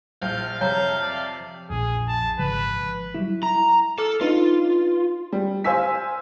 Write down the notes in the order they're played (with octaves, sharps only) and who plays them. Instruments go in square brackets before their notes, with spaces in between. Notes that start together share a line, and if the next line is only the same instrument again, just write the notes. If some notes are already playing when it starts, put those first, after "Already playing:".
[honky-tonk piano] A#1 F6 [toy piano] C5 [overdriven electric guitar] F5 [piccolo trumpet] G6
[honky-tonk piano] F2 C3 [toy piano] C#5 A#5 [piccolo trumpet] G6
[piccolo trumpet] D5
[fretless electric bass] A#1 F2 [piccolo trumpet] G#4
[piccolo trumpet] A5
[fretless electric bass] G#1 C#3 F3 [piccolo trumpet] B4
[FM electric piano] F#3 G3 E4
[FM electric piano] E4 [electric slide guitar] A#5
[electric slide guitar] A4 [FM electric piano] D6 F6
[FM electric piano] D4 D#4 B4 [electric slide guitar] F4
[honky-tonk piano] G3
C5 F5 G#5 E6 B6